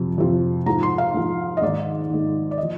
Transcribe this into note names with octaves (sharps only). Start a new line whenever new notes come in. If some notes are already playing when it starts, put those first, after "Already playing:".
Already playing: F2 C3 F3
F2 C3 F3
G#2 F3 A#5
C6
F5
G#2 F3
D#5
G#2 D#3 D5
G#2 D#3
D5
D#5
F3